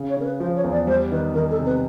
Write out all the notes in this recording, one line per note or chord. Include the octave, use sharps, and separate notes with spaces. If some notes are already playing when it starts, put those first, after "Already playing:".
Already playing: C#3
C#5
C#3 A#4
B4
F3 C5
C#5
E2
D5
G3 C5
D#3 B4
D#3 A#4
A4
C3
B4